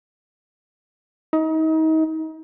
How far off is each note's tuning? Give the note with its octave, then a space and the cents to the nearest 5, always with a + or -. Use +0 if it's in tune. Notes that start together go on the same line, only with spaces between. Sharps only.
D#4 +35